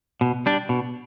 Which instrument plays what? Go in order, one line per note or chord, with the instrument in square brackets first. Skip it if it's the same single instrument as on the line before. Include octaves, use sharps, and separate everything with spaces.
[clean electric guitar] B2
G3 D4
B2